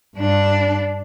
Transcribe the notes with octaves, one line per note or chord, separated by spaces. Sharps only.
G2 D4